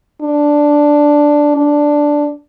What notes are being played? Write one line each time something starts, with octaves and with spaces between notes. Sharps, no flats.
D4
D4